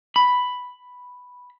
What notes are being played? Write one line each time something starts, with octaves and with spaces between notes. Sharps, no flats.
B5